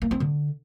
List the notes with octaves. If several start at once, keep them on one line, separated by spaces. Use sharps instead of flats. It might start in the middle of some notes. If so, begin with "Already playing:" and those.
A#3
C4
D3